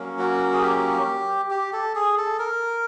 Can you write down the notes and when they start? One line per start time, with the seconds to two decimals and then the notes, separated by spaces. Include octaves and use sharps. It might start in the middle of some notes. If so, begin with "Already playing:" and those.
Already playing: F#3 A#3 C#4
0.19 F#4
0.53 G#4
0.62 G4
1.51 G4
1.73 A4
1.95 G#4
2.18 A4
2.39 A#4